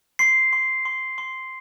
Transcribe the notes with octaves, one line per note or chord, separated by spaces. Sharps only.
C6 C7
C6
C6
C6